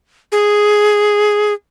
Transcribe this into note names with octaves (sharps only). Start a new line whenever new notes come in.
G#4